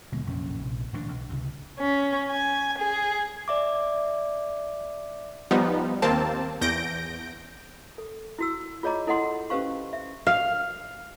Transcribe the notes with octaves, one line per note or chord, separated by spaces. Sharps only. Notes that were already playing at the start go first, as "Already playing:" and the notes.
D#1 B2 D3 G#3
F1 A#1 F#2 C#4
A#1 C3
D1 A1 G2 D4
B1
C#2 C3
C#4
G#5
G#4
D5 E5 D6
F3 G3 B3 D#4
D#2 A#3 C4 A5
E2 G6 A#6 D7
A4
E4 F#4 E6
F4 G#4 C#5 D#5 A#5 D6
E4 A4 D#5 F#5 C6
C#4 G4 B4 C5 F5 C#6
E5
F5